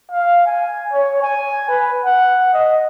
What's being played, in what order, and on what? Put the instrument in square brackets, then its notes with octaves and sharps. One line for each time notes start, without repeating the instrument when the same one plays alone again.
[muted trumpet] F5
G#5
C#5
G#5
B4
F#5
D#5